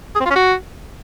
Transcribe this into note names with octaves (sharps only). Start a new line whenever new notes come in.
G#4
C4
F4
C#4
F#4